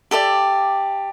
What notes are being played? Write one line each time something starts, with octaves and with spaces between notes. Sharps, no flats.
G4 A4 D5 E5